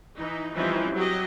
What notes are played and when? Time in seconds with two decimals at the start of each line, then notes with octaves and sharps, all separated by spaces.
0.16 E3 D#4
0.54 E3 F3 G3 C4 C#4 D#4
0.94 F#3 G4 D#5